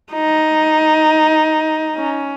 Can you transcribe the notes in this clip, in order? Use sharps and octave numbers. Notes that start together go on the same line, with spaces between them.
D#4
C#4